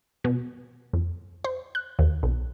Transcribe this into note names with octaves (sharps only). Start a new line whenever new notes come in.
B2
F2
C5
F#6
D#2
B1